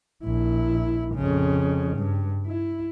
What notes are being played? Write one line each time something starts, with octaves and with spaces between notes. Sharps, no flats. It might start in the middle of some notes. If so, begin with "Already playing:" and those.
A#1 E4
F2 C#3
G2
E4